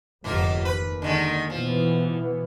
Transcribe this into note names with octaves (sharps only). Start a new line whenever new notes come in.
F1 D2 G#2 B2 A#3 F4
D#2 B4
D3 D#3 G#3
B2 E3 F3 B3